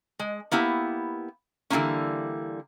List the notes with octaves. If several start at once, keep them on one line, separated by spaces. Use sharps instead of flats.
G#3
A#3 B3 E4 G4
D3 E3 F#3 G3 A#3 C#4